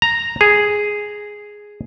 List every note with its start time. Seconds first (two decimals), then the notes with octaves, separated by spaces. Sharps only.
0.02 A#5
0.41 G#4